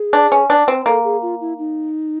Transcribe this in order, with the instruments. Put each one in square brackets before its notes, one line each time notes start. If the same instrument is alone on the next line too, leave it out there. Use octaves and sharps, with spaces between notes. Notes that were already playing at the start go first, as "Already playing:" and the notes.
Already playing: [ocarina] G#4
[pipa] D4
C#4
D4
C4
[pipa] A#3 [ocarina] A4
[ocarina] G#4
F4
E4
D#4